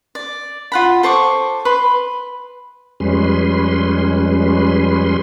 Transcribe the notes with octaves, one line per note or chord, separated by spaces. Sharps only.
D5
F4 F#5 B5
A4 C5 C#6 D6
B4 B5 C6
F2 G3 G#3 C#4 B4 C6